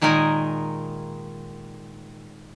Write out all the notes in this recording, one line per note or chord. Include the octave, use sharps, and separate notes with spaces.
A#2 D#3 G#3 D#4 A#4 G#5